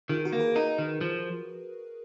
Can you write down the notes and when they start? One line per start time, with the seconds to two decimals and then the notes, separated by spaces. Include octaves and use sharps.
0.09 D#3 F4 G#4
0.25 F#4 A#4
0.33 A#3
0.40 G#4 B4
0.55 D#4 F#4 A#4
0.78 D#3
1.01 F3